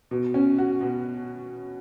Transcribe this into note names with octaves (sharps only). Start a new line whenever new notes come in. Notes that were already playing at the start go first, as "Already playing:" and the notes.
B2
C#4
F#4
B2